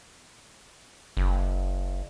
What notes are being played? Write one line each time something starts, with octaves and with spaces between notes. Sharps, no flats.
F#1